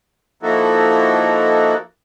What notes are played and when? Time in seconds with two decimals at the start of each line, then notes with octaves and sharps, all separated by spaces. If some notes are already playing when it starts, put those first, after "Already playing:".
0.43 F3 A#3 D#4 E4 F#4 A4